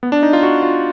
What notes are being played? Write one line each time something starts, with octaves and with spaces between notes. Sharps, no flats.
B3
D4
D#4
F4
F#4
F4